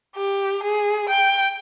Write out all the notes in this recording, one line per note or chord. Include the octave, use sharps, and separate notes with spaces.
G4
G#4
G5